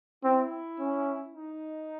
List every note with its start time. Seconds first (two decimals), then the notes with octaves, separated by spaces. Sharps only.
0.24 C4 E4
0.79 C#4
1.34 D#4